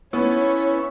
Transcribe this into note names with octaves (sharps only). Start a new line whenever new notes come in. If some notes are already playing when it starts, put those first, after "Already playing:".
B3 C#4 E4 C#5